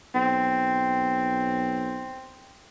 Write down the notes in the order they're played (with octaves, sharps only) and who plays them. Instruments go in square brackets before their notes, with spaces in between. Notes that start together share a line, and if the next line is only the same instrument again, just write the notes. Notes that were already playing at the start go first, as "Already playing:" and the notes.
[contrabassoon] B1 [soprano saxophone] C4